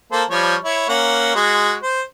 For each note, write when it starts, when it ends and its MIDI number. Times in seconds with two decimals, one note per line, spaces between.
0.12 0.23 58
0.12 0.23 69
0.12 0.23 72
0.30 0.55 53
0.30 0.55 55
0.30 0.55 73
0.64 0.88 64
0.64 0.88 73
0.89 1.34 58
0.89 1.34 61
0.89 1.34 78
1.35 1.74 56
1.35 1.74 66
1.83 2.02 72